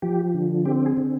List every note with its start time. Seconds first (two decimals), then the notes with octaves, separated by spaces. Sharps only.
0.02 F3 G4
0.34 D3
0.65 C4 G4
0.86 G#4
0.97 D3